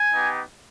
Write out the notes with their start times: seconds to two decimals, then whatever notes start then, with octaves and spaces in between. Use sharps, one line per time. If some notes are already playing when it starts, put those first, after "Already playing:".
Already playing: G#5
0.14 B3 D#4 G4